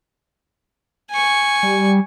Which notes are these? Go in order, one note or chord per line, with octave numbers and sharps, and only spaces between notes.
G#5 C#6
G3